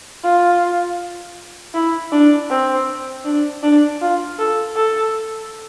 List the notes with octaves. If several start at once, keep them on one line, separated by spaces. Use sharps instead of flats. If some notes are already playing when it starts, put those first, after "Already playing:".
F4
E4
D4
C4
D4
D4
F4
A4
A4